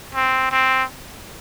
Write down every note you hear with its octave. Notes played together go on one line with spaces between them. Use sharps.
C4
C4